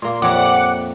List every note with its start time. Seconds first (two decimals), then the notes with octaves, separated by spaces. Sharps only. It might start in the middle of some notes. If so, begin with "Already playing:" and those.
0.02 A#2 A#3 C6
0.22 F2 A#2 G3 C#5 E5 F#5 D6